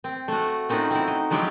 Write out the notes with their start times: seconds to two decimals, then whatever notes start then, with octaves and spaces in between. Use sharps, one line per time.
0.04 C4
0.28 A3 F#4
0.69 C4 C#4 D#4 F4 F#4 F#5
0.91 C4 E4
1.08 D#4
1.30 F3 F#3 G#3 E4 F4 G4